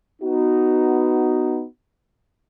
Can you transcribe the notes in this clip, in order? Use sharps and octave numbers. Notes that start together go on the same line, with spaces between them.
B3 D#4 F#4